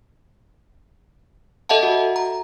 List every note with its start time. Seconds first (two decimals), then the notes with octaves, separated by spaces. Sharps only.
1.69 A4 D#5 E5 F#5 A5
1.83 F#4
2.16 A#5